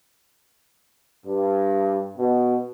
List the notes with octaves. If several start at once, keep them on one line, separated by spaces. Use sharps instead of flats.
G2
B2